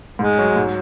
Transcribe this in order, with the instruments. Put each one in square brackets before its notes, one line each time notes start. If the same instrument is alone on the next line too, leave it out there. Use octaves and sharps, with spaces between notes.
[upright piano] G#2 [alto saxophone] G#3
[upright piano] F#3
G#2